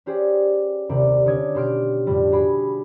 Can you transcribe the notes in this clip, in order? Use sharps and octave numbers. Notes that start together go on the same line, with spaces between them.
C#4 G4 G#4 C5 D5
D#1 C2 C3 D5
D3 C#4 C#5 D5 D#6 G#6
B2 G4 C6 F6 D7
F2 A2 D3 G3
F#4 G#4 B5 D6